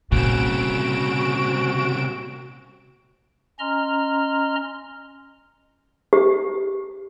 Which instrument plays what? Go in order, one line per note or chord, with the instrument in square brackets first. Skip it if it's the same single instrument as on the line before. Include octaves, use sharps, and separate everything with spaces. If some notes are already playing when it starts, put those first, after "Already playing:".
[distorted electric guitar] C2 C#3 [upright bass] A#2 [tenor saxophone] F#4 [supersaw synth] D7 E7
[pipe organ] C#4 D#5 A#5 C6 F6
[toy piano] G4